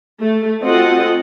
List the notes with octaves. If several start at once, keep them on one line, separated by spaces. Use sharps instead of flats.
A3
C4 F4 F#4 A4 D#5 F#5